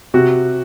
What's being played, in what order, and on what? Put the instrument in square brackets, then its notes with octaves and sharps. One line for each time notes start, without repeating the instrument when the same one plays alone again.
[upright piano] C3 F#4